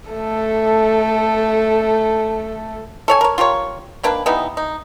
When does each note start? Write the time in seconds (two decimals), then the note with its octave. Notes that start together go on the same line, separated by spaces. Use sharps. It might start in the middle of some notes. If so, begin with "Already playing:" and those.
0.10 A3 A4
3.08 A4 C#5 G#5
3.21 A#4 C#5
3.38 F4 G4 A#4 C#5
4.03 D#3 A#3 D4 B4
4.26 E3 G3 B3 D#4
4.57 D#4